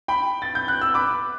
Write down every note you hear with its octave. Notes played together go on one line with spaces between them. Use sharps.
G5 B5
A6
G6
F#6
E6
B5 D6